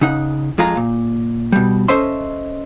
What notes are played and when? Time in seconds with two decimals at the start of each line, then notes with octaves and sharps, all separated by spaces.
0.01 C#3 D#4 F#5
0.58 F2 G#3 F4 G#4 A#5
0.77 A#2
1.52 B2 G3
1.88 C#4 A4 C5 D#5 E5 C6